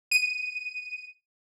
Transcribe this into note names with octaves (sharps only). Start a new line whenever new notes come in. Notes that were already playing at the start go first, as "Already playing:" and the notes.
D#7